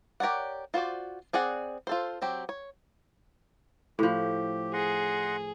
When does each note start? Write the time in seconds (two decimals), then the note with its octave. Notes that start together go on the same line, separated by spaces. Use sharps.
0.20 G4 A#4 C#5 D5 F#5
0.74 F4 F#4 C5 D5
1.33 C4 G#4 D5 F#5
1.87 F4 A4 C5
2.22 F#3 C4 G4
2.49 C#5
3.99 A2 F3 G4
4.74 G#4 D#5 F#5 C6